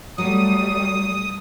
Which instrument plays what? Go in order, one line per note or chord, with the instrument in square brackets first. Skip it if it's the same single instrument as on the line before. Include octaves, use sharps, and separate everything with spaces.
[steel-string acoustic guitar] F#3 [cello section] G3 A3 [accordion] D#6